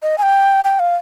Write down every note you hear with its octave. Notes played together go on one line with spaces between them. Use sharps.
D#5
G#5
G5
G5
F5